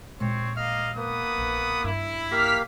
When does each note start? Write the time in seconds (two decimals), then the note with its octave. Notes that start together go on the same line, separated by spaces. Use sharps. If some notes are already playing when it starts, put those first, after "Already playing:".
0.20 A#2 G#3 C4 C#5
0.57 A#3 D#5 F5 F6
0.96 A#3 B3 B4 D#6
1.38 A#1
1.84 G2 D4 E4
2.31 A#3 G4 F5 F6 B6